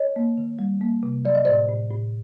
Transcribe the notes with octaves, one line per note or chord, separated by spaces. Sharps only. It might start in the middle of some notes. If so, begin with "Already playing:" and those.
Already playing: C#5 D#5
A#3
D#3
G3
A#3
C3
F#3 D5
D#5
A2 C5 D5
A2
A2